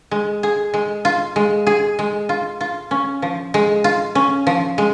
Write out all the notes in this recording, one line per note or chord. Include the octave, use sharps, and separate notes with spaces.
G#3
G#4
G#3
F4
G#3
G#4
G#3
F4
F4
C#4
F3
G#3
F4
C#4
F3
G#3